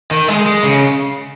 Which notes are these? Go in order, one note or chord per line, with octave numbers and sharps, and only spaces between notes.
D#3
G#3
G#3
C#3